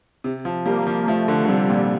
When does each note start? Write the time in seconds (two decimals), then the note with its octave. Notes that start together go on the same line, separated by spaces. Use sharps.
0.24 C3
0.45 F3
0.66 G3 A#3
0.87 F3
1.08 F3 A3
1.28 D3
1.45 D3
1.49 C3 G3
1.70 A#2